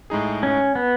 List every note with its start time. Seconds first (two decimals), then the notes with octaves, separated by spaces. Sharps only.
0.10 A2 G#3 D#4 G#4
0.43 C#4
0.75 B3